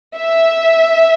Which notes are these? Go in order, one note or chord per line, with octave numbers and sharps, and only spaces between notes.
E5